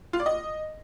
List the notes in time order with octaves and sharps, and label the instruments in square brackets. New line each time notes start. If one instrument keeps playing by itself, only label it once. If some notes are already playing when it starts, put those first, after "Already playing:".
[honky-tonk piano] F4
D5
D#5